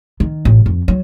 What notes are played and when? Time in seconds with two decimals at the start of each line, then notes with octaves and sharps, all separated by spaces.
0.20 D#3
0.45 A1
0.66 F2
0.88 F#3